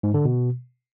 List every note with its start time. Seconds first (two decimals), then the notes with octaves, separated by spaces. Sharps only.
0.03 G#2
0.14 D3
0.25 B2